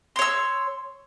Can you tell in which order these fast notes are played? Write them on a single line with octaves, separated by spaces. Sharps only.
C6 C#5 E6